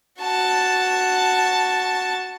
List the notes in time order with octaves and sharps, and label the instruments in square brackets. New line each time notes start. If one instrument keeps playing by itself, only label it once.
[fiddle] F#4 A5